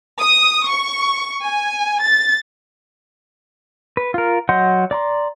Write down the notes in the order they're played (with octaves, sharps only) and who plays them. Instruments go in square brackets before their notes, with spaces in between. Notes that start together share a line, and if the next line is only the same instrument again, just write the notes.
[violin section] D#6
C#6
G#5
A6
[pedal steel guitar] B4
F4 A#4
F#3 D#5 F#5 C6 G6
D5 A#5 C6